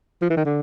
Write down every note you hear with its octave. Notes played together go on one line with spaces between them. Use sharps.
F3
E3
D#3
D3